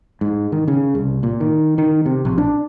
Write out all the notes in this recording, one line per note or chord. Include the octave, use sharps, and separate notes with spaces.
G#2
D#3
C#3
C2
A#2
D#3
D#3
C3
A#1
D4